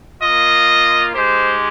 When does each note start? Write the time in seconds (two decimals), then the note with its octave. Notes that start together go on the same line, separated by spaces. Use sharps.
0.21 A#3 F4 D#5
1.14 G#3 D#4 G4 C5